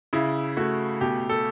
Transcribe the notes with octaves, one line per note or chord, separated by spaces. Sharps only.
C#3 E4
A3 F#4
B2 G4
A4